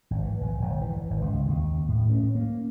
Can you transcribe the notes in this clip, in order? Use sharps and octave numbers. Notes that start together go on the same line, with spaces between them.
G#1
E3
A#1
G1
E3
G#1
C#2
D#2
A2
C#4
A#3